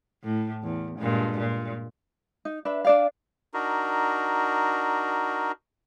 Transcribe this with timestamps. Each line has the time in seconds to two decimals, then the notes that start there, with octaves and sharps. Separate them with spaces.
0.24 A2
0.63 E2
0.99 G2 A#2 G#3
1.38 A#2
2.45 D#4
2.65 D4 B4 E5
2.85 D4 D5 F5
3.54 D4 D#4 F#4 A#4